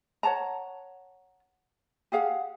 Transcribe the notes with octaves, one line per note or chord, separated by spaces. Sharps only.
C#5 F#5 A5 A#5
G4 G#4 F5 F#5